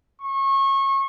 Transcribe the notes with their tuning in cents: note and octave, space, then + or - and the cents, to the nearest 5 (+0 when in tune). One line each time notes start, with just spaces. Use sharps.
C#6 -30